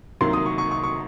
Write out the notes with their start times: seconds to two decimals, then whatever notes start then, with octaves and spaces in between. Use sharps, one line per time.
0.21 C2 C3 D#3 F#3 A#3 C6
0.33 D#6
0.46 C#6
0.58 C#6
0.71 C#6
0.84 C#6